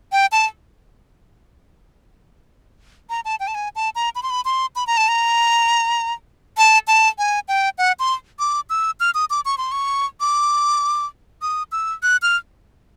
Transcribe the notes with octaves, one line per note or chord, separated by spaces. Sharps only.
G5
A5
A#5
A5
G5
A5
G#5
A5
A#5
B5
C6
B5
C6
B5
A#5
A5
A#5
A5
A5
G#5
G5
F#5
C6
D6
E6
F6
D#6
D6
C#6
C6
C#6
D6
D#6
E6
F#6
F6